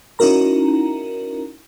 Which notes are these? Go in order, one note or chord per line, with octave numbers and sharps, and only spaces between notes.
C#4 D#4 E4 F#4 A#4 A#5